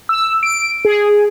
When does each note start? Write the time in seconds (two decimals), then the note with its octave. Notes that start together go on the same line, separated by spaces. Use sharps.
0.09 E6
0.43 D7
0.85 G#4